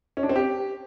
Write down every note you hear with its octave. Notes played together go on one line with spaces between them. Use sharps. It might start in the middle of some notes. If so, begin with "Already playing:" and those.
C#4
D4
C4
G4